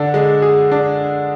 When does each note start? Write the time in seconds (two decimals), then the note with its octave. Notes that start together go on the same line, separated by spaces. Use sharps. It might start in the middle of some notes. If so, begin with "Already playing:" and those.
Already playing: D3 D4
0.14 G#3
0.42 G#4
0.72 D4